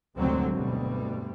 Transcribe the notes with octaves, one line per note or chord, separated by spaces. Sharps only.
F1 D2 G#2 D3 F#3 C4
D2 G2 B2 G3